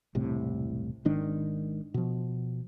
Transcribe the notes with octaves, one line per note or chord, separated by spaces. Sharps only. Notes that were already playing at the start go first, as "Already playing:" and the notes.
E1 C2 A2 C3
G#1 G#2 D#3 D4
B2 F3